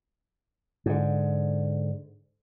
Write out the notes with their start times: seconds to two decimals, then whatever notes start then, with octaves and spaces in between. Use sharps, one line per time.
0.86 G#2 D3